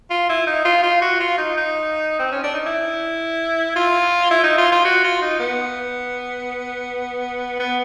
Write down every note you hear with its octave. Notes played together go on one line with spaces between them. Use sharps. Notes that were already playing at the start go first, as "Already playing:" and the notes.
F4
E4
D#4
F4
F4
F#4
F4
D#4
D#4
C4
C#4
D4
D#4
E4
F4
E4
D#4
F4
F4
F#4
F4
D#4
B3
B3